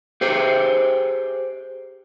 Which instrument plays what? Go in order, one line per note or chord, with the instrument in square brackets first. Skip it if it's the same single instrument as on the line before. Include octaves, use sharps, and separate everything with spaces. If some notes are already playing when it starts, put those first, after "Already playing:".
[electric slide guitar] G4 G#4 C5